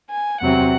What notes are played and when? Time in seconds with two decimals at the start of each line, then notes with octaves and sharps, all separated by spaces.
0.10 G#5
0.41 E2 C3 F#3 C4 F#5